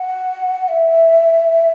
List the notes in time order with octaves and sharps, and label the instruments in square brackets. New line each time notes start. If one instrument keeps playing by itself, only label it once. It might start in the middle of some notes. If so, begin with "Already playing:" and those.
Already playing: [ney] F#5
E5